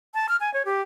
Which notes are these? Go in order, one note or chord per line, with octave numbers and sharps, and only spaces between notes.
A5
F6
G#5
C#5
G4